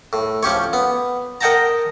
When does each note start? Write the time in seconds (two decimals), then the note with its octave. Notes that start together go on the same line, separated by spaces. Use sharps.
0.13 A2
0.43 F3 C#4 G4 C#5
0.73 B3
1.41 A#4 D#5 F#5 G5 A5 A#5